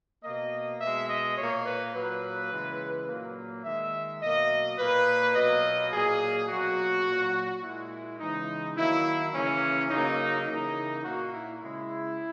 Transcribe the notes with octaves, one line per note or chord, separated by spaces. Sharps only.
B2 A#3 D#5
B2 G#3 E5
D#5
A#2 A#3 C#5
B4
A#2 F#3 A#3 B4
C#3 E3 G#3
A#2 F#3 A#3
D#3 G#3 E5
B2 F#3 A#3 D#5
A#2 A#3 B4
B2 F#3 A#3 D#5
A#2 F#3 A#3 G#4
B2 F#3 A#3 F#4
A#2 F#3 A#3
A#2 G#3 E4
C#3 E3 G#3 D#4
D#3 F#3 A#3 E4
C#3 E3 A#3 C#4
C#3 F#3 A#3 D#4
C#3 E3 A#3 D#4
A#2 A#3 F#4
E4
C#3 G#3 E4